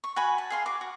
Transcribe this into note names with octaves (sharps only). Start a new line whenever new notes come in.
C#6
F#4 G#5 B5
A5
G#4 F5 C6
F#4 D6
F#4